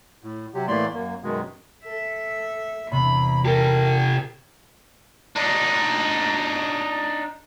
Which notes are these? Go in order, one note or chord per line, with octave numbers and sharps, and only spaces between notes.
A2
C3 F#3 G4
A2 E3 A3 A#3 D5 C6
F#2 A#3
F#2 B2 D#3 G#3
A4 E5
E2 C3 B5
G4 A4 A#4
D4 D#4